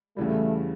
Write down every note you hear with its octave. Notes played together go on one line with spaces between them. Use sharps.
E2 C#3 E3 G3 A3